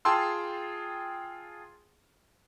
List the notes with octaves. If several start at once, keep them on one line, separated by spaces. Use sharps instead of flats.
F4 G#4 G5 A5 C6 E6